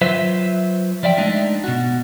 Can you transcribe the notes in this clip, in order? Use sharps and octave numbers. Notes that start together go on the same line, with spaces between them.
F#3 F4 B4 C5 E5
F3 D5 E5 G5
G#3 A3 D4 D#4
B2 F#4